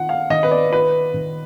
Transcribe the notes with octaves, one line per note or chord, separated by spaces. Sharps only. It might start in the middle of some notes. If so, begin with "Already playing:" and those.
Already playing: D#3 F4 F#5
F5
D#3 D#5
B4
D5
F4 B4
D#3